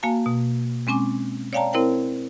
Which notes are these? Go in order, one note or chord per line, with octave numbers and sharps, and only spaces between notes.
A#3 F#4 F5 G#5 A5
B2
G#3 C4 C#4 G#5 D6
C#5 D5 F5 G5 A5 A#5
C4 E4 A#4 C5 G5